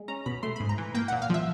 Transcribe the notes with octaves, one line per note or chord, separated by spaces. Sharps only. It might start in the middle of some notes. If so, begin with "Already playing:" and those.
Already playing: G#3
C#4 A#5
B2 B5
A3 C6
B5
G#2
A#5
E3
A#3 G5
F#5
A#2
F5
F3 E5